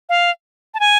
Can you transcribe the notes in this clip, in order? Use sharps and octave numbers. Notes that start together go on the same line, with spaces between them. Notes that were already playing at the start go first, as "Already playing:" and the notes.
F5
A5
G#5